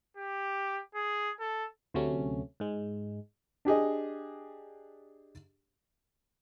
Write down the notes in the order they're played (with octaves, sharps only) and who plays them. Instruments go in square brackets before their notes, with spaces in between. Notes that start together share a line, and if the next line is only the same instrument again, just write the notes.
[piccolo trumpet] G4
G#4
A4
[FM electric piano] D2 C3 F#3 A3 C#4
G#2 G#3
[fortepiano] D4 G4 G#4 D#5